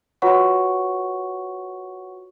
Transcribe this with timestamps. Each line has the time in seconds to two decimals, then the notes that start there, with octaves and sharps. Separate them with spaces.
0.22 F4 F#4 B4 C#5 F#5 C#6